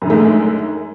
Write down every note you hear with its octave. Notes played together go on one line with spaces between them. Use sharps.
F#2 D3 D#3 G#3 A3